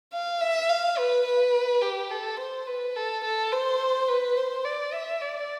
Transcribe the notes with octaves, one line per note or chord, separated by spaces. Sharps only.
F5
E5
F5
B4
B4
G4
A4
C5
B4
A4
A4
C5
B4
C5
D5
E5
D5